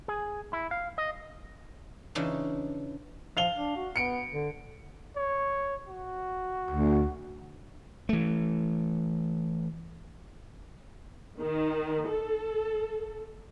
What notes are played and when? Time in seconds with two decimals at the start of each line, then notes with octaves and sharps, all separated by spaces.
0.08 G#4
0.53 E4
0.71 F5
0.98 D#5
2.15 C#3 E3 D4 D#4
3.37 F3 F5 F7 G7
3.56 D4
3.76 F#4
3.96 B3 C#7 D7
4.32 D3
5.16 C#5
5.88 F#4
6.70 D2
8.09 E3 A3
11.38 D#3
12.08 A4